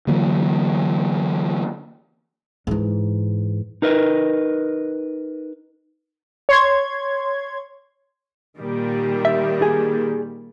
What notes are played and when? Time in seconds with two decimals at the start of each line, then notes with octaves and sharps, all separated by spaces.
0.07 D3 E3 F#3 A#3
2.67 G#2 E3
3.82 D#4 A#4 B4 D#5
6.49 C#5 C6 G#6
8.58 A#2 D#3 G3
9.25 E5
9.62 G#4